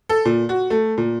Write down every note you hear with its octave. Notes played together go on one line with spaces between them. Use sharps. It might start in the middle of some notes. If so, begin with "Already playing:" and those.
A4
A#2
F#4
A3
A#2